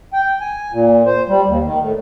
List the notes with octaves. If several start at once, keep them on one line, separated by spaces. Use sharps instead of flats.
G5
G#5
A#2
C5
G3
D#2
D#3
A2